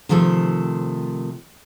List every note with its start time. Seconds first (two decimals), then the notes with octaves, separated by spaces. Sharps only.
0.09 C3 D#3 F3 A3 A4